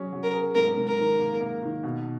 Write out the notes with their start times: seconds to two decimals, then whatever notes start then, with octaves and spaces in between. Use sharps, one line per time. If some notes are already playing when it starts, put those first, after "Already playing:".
Already playing: F#3 C#4 G#4
0.13 F#3
0.23 A#4
0.33 G#4
0.55 G#2 A#4
0.77 G#2
0.88 A#4
0.98 D#3
1.20 A#3
1.41 A#3
1.63 D#3
1.83 B2